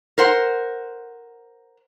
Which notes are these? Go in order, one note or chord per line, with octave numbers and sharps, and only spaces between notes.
A#4 C5 F#5